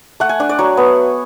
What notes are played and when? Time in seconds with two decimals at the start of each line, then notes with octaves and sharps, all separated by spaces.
0.20 A3 F#5
0.29 G#5
0.40 D4
0.49 D5
0.59 F#3 C#5
0.77 B3